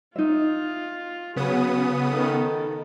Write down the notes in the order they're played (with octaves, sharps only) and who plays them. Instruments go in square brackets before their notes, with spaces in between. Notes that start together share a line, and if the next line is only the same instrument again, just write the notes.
[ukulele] D#4 E5 [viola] F4
[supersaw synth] C#3 B3 D#6 [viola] F#3 G#4
[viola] D#3 A4